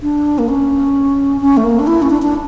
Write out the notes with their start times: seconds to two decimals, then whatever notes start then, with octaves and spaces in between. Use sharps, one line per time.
0.03 D4
0.39 A#3
0.48 C#4
1.41 C#4
1.57 A3
1.64 A#3
1.79 D4
1.87 E4
2.02 C#4
2.10 D4
2.22 D4